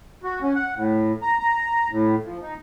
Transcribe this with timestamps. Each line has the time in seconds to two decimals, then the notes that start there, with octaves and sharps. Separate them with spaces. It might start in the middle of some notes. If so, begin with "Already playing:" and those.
0.23 F#4
0.42 C#4
0.56 F#5
0.76 A2
1.22 A#5
1.39 A#5
1.91 A2
2.25 F3
2.41 D#4